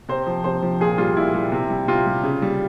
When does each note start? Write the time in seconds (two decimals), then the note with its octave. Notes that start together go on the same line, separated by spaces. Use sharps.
0.09 C3 C5
0.27 F3
0.44 C3 C5
0.63 F3
0.80 A#2 G#4
0.98 G3 F4
1.16 A#2 E4
1.34 G3
1.52 C3
1.70 G3
1.88 C3 F4
2.06 G3
2.24 C#3
2.42 G3